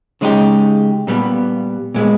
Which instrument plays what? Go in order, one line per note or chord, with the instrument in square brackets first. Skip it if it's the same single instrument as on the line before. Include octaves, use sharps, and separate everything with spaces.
[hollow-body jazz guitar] C#3 G#3 D#4 G4
A#2 G3 B3
A#2 G#3 B3